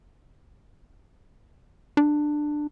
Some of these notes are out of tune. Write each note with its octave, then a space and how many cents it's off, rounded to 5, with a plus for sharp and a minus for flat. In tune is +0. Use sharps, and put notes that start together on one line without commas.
D4 +15